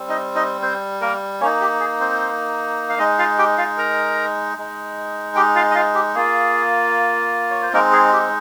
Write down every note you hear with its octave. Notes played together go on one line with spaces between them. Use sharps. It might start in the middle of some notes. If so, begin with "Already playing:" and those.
Already playing: G3 C4
D#4 D#5
D#4 D#5
C4 C5
A#3 A#4
A#3 C#4 D#4 C#5
G4
G#4
C4 C5
F5
G#3 D#4 D#5
F4 F5
G4 G5
F4 F5
A#4 A#5
G#3 D#4
G4 G5
F4 F5
D#5
F4 F5
G4
A#3 F4 G#4
C#5
C5
G#3 A#3 C4 D#4 A#4
G#4
G4